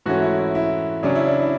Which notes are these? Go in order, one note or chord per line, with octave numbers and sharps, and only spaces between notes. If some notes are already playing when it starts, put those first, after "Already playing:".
G#2 E3 A3 C#4 F#4
E4
E4
E4
C#3 F#3 C#4 D4
E4
D4
E4